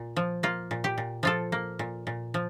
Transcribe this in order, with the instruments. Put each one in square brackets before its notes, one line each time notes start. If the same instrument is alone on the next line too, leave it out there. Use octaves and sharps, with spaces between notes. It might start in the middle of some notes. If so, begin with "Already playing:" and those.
Already playing: [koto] A#2
F3
A#3 F4
A#2
G4
A#2
F3 F4 A4
A#3
A#2
A#2
F3